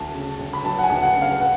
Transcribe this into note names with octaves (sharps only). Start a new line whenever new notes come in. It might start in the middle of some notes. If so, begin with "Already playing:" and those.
Already playing: D2 A5
C#3
D2
B5
F#3 A5
F#5
G#5
D2
F#5
C#3
F5
F#5